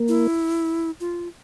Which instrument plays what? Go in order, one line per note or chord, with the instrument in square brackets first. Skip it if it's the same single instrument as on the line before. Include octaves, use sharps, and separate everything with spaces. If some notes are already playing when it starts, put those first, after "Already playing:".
Already playing: [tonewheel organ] A#3
[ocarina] E4
F4